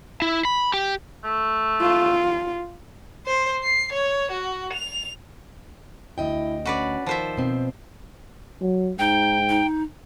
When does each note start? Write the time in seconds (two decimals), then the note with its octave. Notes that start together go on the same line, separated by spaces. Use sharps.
0.22 E4
0.45 B5
0.74 G4
1.24 A3
1.82 F4
3.27 C5
3.63 C7
3.92 C#5
4.31 F#4
4.73 F7
6.18 D2 E4 D#5 G5
6.65 C#4 F#4 B4 D5
7.06 D#3 F3 C5 E5
7.37 B2 C4
8.61 F#3
8.99 G#2 D#4 G5
9.49 D#4